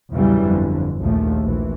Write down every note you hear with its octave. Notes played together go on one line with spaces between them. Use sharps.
A#1 E2 C#3 E3 F#3 G3
G1 F2 D3
A#1 D#2 F3 A3
A#1 E3